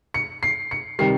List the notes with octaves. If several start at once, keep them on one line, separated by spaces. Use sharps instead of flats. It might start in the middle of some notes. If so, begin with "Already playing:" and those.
C#7
C7
C#7
C3 D#3 G3 C7